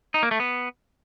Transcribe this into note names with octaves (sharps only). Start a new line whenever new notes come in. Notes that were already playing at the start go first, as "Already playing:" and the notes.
D#4
A#3
A3
B3